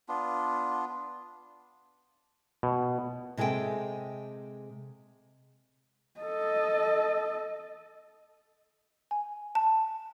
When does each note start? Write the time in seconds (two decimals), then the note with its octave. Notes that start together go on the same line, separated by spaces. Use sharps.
0.08 B3 D4 F4
2.63 B2
3.37 C3 G#3 G#4 A4 G5
6.20 A4 D#5
9.11 G#5
9.55 A5